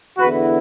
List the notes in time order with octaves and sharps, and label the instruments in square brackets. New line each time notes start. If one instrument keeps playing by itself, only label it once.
[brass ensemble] E2 D3 B3 E4 F#4 B4